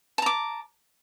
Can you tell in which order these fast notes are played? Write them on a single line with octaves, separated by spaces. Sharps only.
A5 A#5 D6